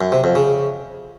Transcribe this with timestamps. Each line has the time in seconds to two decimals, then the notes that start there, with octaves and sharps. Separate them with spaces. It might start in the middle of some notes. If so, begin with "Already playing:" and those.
0.01 F#2
0.12 C3
0.24 F2
0.35 C#3